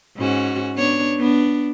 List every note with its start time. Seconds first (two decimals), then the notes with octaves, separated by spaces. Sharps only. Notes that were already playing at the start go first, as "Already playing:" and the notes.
0.17 G#2 C#4 F#4
0.75 B3 D4 C#5
1.19 B3 D4